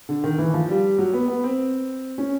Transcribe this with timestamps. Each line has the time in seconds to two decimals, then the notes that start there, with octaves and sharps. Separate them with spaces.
0.09 D3
0.24 D#3
0.38 E3
0.54 F3
0.69 G3
0.98 F#3
1.13 B3
1.28 B3
1.44 C4
2.18 C#4